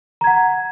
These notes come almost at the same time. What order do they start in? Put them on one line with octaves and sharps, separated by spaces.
A#5 G#6 F#5